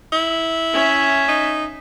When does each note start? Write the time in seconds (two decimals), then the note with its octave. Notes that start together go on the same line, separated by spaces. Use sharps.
0.13 E4
0.73 C#4 E5
1.28 D#4